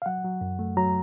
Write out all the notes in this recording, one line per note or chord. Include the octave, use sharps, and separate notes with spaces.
F5
F#3 F#5
F#3
F#2
A3
F#3 A#5